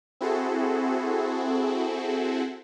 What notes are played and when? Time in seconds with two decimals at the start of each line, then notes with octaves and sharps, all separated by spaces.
0.21 C4 E4 F#4 G#4 A4